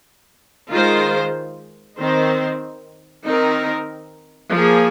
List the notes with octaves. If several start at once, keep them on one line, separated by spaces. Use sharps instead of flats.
D#3 G#3 F4 C5
D#3 C4 D#4 C5
D#3 C4 D#4 A#4
F3 A#3 G#4